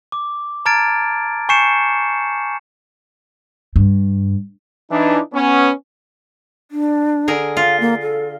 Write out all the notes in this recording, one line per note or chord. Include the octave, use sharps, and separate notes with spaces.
D6
A5 A#5 F6 G#6 A6 D7
G#5 C#6 G6 C7 C#7 E7
G2
E3 D4 D#4
B3 C#4
D4
D3 G#4 A#4
F4 F5
A#3
A4